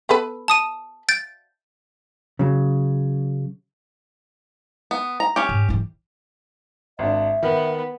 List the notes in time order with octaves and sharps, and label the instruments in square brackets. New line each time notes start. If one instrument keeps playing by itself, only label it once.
[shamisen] B3 A4 B4
[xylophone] A5 D#6 D#7
G6 A6 D7
[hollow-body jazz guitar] C#3 F#3
[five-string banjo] B3
A#5
C#4 G4
[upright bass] G#2
G#2 E3
[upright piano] G#1 D4 [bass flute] E5
[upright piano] D#3 [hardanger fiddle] B3